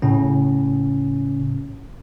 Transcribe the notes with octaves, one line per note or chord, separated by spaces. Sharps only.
A2 C#3 C#4